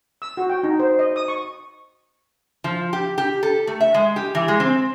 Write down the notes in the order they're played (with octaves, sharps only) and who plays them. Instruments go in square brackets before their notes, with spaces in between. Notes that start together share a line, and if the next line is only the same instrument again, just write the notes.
[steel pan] E6
F#4
G5
D#4
C5
D#5
D#6
C#6
[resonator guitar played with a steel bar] F3
G4
G4
A4
A3
E5
G#3
G4
E3
G#3
C4